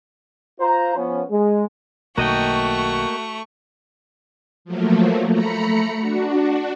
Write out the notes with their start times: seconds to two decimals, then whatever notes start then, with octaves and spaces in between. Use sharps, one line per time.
0.60 F4 C5 A#5
0.96 F3 B3 C#4
1.31 G#3
2.18 B1 D#3 A3 A#3 F#4 D#5 G5 C#6
4.65 F3 F#3 A3 A#3
5.30 A3 A#5 B5 C#7
5.97 D4 F#4